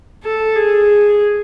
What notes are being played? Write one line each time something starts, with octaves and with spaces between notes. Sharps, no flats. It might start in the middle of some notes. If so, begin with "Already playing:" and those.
A4
G#4